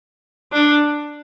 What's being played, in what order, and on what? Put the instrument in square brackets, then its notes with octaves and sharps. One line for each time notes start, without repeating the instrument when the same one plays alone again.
[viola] D4